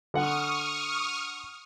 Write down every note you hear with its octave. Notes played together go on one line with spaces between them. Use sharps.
D3 F#5 C#6 D#6 F6